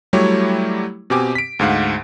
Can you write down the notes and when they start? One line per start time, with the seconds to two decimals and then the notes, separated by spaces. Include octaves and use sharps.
0.13 F#3 G3 A3 E4 G4 C#5
1.10 B2 C4 G4 G#5 D6
1.35 B6 D7
1.59 D2 G#2 F5 F#5